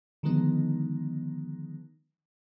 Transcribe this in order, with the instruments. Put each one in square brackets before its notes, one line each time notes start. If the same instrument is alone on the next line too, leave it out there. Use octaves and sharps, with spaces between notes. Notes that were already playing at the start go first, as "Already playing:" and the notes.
[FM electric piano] D3 D#3 F3 G#3 B3 D#4